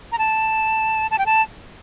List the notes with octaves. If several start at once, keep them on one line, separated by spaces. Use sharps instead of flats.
A#5
A5
A5
G5
A5